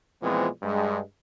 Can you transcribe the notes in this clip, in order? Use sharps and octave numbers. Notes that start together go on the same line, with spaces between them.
A#2 E3 F3 G#3 B3 C4
G2 G#3